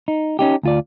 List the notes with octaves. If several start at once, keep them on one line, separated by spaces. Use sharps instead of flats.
D#4
C#4 D#4 G4
D2 F4 D5